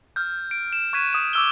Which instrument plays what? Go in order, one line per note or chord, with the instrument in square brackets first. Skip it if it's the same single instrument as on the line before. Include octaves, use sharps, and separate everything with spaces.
[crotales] F6 G6
D7
E7
C#6 F#6 G#6 B6 D#7 E7
D#6 E7
D6 E6 G7